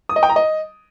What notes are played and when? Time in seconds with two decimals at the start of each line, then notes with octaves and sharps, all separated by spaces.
0.09 D#6
0.16 D#5
0.23 G5
0.29 A#5
0.36 D#5